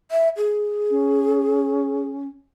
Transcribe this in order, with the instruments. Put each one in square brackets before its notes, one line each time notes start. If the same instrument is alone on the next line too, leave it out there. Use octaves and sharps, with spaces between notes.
[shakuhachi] E5
G#4
[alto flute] C#4